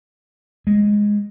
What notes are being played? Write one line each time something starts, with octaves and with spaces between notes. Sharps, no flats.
G#3